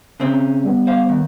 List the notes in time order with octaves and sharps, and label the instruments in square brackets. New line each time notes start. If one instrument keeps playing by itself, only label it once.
[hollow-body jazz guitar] C#3 C4 C#4
[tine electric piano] G3 B3
[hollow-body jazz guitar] C5 F5
D#2